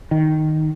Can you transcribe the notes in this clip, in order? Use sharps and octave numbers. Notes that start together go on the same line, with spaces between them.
D#3